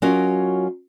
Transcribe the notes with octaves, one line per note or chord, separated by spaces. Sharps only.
F#3 C#4 F4 F#4 A#4 D#5